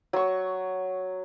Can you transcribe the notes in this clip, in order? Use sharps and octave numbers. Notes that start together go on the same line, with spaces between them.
F#3 C#6